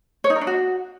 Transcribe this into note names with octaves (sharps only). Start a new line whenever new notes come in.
C#5
D#4
A#4
D4
F#4